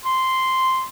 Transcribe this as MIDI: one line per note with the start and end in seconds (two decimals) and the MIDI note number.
0.05 0.86 84